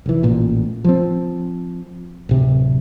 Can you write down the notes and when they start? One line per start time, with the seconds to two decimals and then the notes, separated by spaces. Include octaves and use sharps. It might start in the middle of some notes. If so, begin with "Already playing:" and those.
0.06 F1 E3
0.23 A1 A#2
0.84 F3 C4
2.29 D1 C3